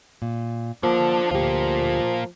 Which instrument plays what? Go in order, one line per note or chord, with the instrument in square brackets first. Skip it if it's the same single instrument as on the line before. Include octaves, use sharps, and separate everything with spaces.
[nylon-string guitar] A#2
[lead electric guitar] D3 D4 [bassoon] F3 [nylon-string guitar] A#3
[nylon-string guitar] D2 G4 [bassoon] F3 [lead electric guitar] A#3 F4